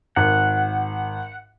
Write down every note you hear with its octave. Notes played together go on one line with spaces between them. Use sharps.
G#1 F#5